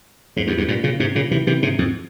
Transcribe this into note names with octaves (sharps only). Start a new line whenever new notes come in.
F2 G#2
E2 G2
E2 G2
G2 A#2
A#2 C#3
G#2 C3
A#2 C#3
C3 E3
C3 E3
G#2 C3
F2 G#2